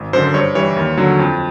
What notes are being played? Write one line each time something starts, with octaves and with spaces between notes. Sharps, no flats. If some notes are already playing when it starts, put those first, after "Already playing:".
Already playing: G#1
F#2 D3 C5
G2 C#5
E3 G3 C#5
D#2
D3 F#3
F2